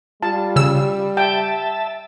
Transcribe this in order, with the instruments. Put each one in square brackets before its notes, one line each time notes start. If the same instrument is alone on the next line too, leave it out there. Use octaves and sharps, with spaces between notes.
[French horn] G3 [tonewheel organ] F4 [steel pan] A5
[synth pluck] C#3 E6
[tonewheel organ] E5 A5 [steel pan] G5